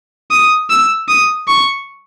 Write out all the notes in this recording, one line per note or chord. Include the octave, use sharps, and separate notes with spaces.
D#6
E6
D#6
C#6